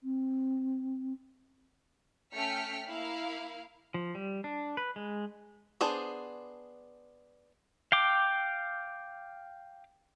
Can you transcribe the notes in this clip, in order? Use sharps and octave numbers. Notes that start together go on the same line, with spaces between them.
C4
A3 C#4 G5 F6 B6 C#7
A#3 E4 F5
F3
G3
D4
B4
G#3
B3 D4 G#4 C5
F5 G5 D6